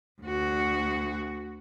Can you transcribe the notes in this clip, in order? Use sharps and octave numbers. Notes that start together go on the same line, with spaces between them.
D2 F#4